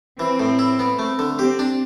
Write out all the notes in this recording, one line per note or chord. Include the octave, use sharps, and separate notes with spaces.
E3 C4
A2
E4
B3
A3
D3
C4 G4
D4